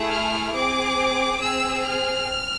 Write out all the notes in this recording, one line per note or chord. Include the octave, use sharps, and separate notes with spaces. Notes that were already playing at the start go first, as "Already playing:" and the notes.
Already playing: A3 E4 G#4
F6
C4 G#4 D6
C4 G#4 E6
F6